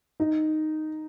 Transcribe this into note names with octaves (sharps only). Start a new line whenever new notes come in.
D#4